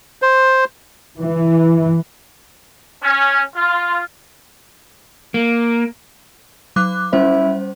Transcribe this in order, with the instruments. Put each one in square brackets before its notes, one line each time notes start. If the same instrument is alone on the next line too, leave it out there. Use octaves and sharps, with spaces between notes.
[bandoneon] C5
[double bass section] E3
[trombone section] C#4
F4
[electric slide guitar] A#3
[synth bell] F#3 D6 F#6
[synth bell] G3 C#4 C5 [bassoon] E4